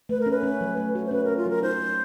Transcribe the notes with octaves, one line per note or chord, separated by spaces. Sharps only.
A3 B4
A#4
C#4 B4
C#4
F#3
A3
F#4
C5
C#4 B4
C#4 A#4
F4
F#3 A#4
D#4 C5
D#4